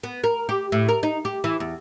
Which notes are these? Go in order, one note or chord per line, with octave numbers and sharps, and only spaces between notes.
B3
A#4
G4
A2
A#4
D#4
G4
E3
E2